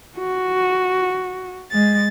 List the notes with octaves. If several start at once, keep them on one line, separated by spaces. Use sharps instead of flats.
F#4
G#3 A6